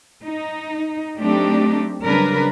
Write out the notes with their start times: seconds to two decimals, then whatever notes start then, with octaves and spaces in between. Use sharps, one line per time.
0.23 D#4
1.19 F#3 A3 C4 D4 D#4 G4
2.01 C#3 F#3 G3 D4 A#4 B4